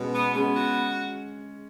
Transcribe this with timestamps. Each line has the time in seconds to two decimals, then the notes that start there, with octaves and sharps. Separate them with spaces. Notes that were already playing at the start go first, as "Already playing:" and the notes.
Already playing: B2 G#3 C#4
0.15 B3
0.35 G#3 B3 C#4
0.56 F#4